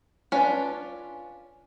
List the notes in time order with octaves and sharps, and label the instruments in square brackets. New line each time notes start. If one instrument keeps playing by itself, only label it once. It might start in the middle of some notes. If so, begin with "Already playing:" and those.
[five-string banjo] C#4 D4 F4 B4